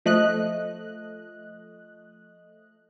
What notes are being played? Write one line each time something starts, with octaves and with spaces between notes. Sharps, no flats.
F3 A3 D#5 F#6